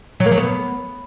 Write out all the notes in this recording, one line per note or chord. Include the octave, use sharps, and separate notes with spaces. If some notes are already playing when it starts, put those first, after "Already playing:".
F#3
A#3
F#3
B3